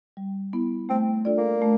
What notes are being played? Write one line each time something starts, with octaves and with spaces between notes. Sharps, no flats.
G3
B3 E4
A3 C4
D4 F4 A4 D5
A#3
A3